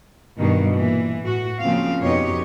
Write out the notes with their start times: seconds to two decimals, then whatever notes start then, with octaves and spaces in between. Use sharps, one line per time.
0.39 G2 B2 D#3
0.75 A#2 E3
1.22 A2 F#4
1.61 C#3 F3 A#3 C4 F5
2.02 F2 B2 D#4 G4 C#5